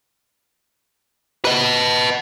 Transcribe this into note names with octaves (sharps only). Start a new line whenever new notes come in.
B4 D#5